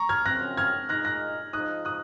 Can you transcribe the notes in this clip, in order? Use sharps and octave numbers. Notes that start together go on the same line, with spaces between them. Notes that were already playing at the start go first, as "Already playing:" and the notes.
Already playing: A#5 C#6
F6 G#6
F#2 C#3 F3 C4 F#6 A#6
F6 G#6
A#2 G#3 D#4 F#6 A#6
F#6 A#6
F3 G#3 D#4 D#6 F#6
D#6 F#6